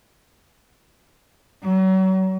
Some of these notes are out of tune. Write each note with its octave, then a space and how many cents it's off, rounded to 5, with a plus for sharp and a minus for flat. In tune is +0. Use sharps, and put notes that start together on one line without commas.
F#3 +35